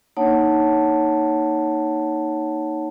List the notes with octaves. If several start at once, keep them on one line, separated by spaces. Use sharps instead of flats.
A#3 D4 D#4 C#5 F#5 A5